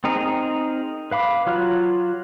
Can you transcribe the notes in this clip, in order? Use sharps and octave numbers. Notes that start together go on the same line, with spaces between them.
C4 D#4 G#4 A#4
B4 F5 B5 D6
F#3 F4 F6 F#6